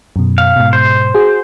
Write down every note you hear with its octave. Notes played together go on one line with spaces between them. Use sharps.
F#2 B2
F5
G#2 B2
C5
F#4 G#4